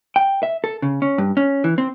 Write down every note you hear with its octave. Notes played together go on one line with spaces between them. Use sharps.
G5
E5
A4
C#3
C#4
G2
C#4
E3
C4